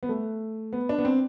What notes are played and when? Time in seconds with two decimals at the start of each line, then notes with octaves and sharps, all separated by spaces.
0.03 B3
0.09 A3
0.73 B3
0.89 D4
0.98 B3
1.05 C4